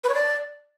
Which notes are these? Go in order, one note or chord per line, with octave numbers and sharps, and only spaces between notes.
B4
C#5
D5